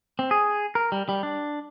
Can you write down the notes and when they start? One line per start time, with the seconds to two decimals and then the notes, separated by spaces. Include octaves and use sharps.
0.19 C4
0.31 G#4
0.75 A#4
0.92 G3
1.09 G3
1.23 D4